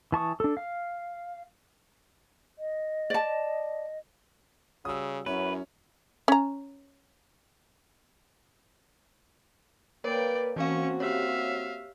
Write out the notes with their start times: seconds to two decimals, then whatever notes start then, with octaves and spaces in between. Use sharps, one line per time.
0.12 E3 A5 C#6 D#6
0.40 D4 A4
0.57 F5
2.57 D#5
3.10 D5 A5
4.85 C#3 G3 F#4 D#6 E6
5.26 F#2 F#3 C#4 E4 B4
6.28 C#4 A#5
10.04 A#3 A#4 B4 C#5 D5 G5
10.56 E3 A#3 C4 C#4 F#4 F5 C#6
11.00 G4 C#5 E5 F5